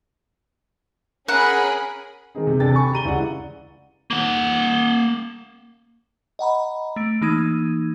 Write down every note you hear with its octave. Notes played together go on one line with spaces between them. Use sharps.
C#4 G#4 A#4 F#5 B5
D#3 G#3 C4 D#4 G#4
C3
C3 D4 A4 G5 A6
G#5 B5 C#6
G4 A#5 D#7 G7
C#2 E4 D5 F#5
A#3 F#5
D#5 F#5 A#5 B5
A3 D7
E3 A#3 D#4 D#6 G#6 D#7